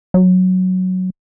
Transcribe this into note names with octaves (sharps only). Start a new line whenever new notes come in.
F#3